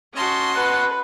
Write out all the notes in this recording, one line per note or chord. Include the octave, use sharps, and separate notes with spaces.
C#4 F#4 D#5 A5 C6
B4 F#5